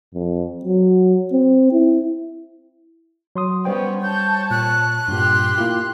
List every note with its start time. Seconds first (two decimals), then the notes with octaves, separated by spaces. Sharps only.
0.14 F2
0.65 F#3
1.33 C4
1.72 E4
3.36 F#3 C6 D#6
3.65 G3 B3 C#4 C5 G5
4.03 C#5 A5 G6
4.51 A#2 F#6
5.08 G2 A#2 G4 C6
5.58 A#3 E4 F4